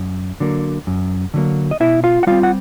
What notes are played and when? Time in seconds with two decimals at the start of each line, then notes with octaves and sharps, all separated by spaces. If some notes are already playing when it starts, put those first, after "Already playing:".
Already playing: F#2
0.40 D3 F#3 A#3
0.87 F#2
1.34 D3 F#3 A#3
1.71 D#5
1.80 B2 E4 E5
2.04 F4 F5
2.23 F#5
2.27 G3 C4 F4 F5
2.43 F#5